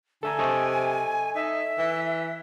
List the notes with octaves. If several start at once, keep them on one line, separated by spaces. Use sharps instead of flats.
D3 A4 E5 G#5 A#5
C3 A4 D#5 C#6
D#4 E5
E3